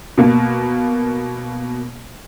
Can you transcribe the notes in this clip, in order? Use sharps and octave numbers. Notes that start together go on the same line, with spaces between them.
B2 A#3